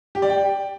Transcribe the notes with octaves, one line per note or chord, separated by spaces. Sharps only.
G4
D5
G5